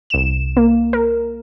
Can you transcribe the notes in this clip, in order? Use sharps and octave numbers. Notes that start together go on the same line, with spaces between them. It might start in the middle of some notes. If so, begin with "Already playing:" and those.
C2 E7
A#3
A#4